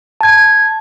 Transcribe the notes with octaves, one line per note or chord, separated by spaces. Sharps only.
A5 G#6